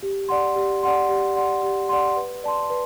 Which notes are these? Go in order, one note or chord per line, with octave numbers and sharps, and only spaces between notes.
G4
D5 F#5 C6
G4
D5 F#5 C6
G4
D5 F#5 C6
G4
D5 F#5 C6
B4
D5 A5 C6
B4